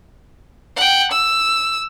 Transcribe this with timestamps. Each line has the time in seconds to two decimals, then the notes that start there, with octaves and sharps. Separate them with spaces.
0.76 F#5 G5
1.12 E6